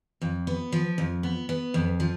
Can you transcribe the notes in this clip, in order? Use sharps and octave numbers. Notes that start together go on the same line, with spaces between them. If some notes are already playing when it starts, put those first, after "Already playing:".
F2
B3
F3
F2
B3
B3
F2
F3